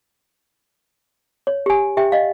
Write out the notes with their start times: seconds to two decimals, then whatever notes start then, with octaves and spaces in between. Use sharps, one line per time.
1.47 C#5
1.66 G4 G#5
1.97 G4 E5 G5
2.12 D#5 F5